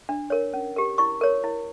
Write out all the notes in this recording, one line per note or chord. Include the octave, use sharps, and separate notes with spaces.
D4
A#4 C#5
C#4
G4 A#4
E4 C#6
A#4 C#5
E4